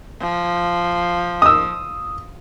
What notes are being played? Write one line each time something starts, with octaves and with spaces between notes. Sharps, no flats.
F3
D#6 E6